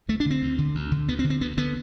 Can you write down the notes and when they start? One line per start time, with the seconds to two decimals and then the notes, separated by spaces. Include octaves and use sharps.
0.08 D2 A3
0.20 D4
0.26 D3 C4
0.42 D2
0.58 D3
0.75 D2
0.92 D3
1.08 D2 B3
1.19 C4
1.24 D3
1.30 C4
1.41 D2 B3
1.57 D3 B3